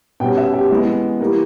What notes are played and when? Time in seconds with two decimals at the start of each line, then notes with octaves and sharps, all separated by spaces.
0.20 B2 G5
0.23 G3 C#4
0.37 E5
0.54 G4
0.70 E3 G#3 B3 E4
1.20 E3 G3 A#3